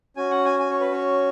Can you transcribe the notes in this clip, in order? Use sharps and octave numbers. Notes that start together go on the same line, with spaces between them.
C#4 F#4 G#5
F#5
G#5
G#5
C#5
B4
C#5